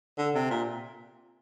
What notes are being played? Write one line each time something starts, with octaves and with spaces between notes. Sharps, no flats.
D3
C3
A#2